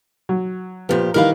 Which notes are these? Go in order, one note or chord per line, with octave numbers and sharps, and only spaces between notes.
F#3
A#2 F3 B3 G4
D#3 E3 G3 A#4 B4 F5